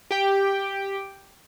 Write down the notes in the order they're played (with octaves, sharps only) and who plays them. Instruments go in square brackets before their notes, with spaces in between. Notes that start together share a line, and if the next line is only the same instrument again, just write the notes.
[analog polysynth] G4 G5